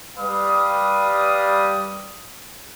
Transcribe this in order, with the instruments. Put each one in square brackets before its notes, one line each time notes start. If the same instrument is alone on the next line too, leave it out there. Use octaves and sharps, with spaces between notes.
[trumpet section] G3 B4 D5 F5 D#6